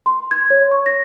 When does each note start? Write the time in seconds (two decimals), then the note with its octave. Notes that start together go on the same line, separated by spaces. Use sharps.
0.06 C6
0.31 G#6
0.50 C#5
0.71 C#6
0.86 A#6